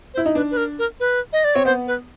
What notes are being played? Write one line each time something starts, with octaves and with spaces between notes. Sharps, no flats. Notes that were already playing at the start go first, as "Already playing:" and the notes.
C5
E4
D#4
D4 B4
B4
A#4
A#4
B4
D#5
D5
C4 C#5
B3 C5
B4